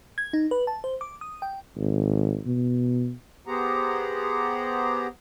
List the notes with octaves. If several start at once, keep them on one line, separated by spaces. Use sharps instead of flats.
G#6
D#4
B4
A5
C5
D6
D#6
G5
G#1
B2
B3 G4 G#4 C5 F#5 A#5